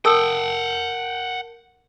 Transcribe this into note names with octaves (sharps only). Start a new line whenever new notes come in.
A4 A#4 F#5 G5 A5 E6